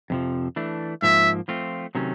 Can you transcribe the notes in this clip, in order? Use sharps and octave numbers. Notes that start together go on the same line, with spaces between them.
F2 C3 F3
E3 A3 D4
G#2 F3 A#3 E5
F3 A3 C4 F4
C3 D#3 F#3 A3 C#4